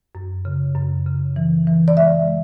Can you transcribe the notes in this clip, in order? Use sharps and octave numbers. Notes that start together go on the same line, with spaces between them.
F#2
C#3
F#2
C#3
E3
E3
D5
G#3 E5
G#3